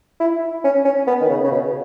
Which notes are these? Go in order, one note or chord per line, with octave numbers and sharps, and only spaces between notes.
E4
C#4
C#4
B3
D#3
C#3
C#3
B2